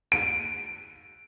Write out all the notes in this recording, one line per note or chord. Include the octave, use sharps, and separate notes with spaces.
D7